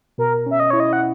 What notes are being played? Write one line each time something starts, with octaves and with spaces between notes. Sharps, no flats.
B2 A#4
C#4 E5
D#5
E4 C#5
D#5
F#5